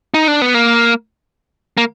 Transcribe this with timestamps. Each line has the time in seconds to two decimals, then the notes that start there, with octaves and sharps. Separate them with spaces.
0.14 D#4
0.28 D4
0.42 B3
0.54 A#3
1.77 A#3